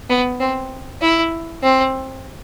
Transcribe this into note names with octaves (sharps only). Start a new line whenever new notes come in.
B3
C4
E4
C4